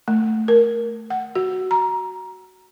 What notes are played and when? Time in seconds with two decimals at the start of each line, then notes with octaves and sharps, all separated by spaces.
0.08 A3
0.48 A#4
1.10 F#5
1.35 F#4
1.71 A#5